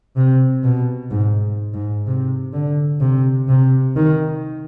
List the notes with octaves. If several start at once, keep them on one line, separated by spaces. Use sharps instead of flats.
C3
B2
G#2
G#2
C3
D3
C3
C3
D#3